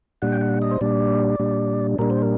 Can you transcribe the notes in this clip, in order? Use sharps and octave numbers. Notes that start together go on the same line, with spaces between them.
A#2 G3 D4 F#5
G5
F#5
D#5
C5
A#2 G3 D4 D5
A#2 G3 D4
A#2 G3 D4 A#4
C5
A#4